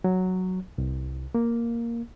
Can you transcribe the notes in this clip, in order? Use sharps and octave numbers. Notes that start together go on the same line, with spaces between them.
F#3
C2
A#3